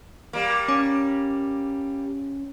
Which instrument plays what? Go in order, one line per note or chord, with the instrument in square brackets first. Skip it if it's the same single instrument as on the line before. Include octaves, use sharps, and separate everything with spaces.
[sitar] G3 A#3
[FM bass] C#4